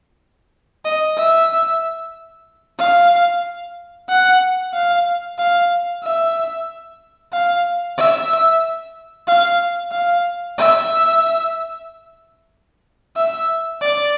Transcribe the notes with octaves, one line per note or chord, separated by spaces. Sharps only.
D#5
E5
F5
F#5
F5
F5
E5
F5
E5
F5
F5
E5
E5
D5